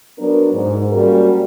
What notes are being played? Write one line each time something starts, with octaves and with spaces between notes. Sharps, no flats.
F#3 B3 D4 A#4
G#2
F#3 G3 A#3 C#4 F#4 A#4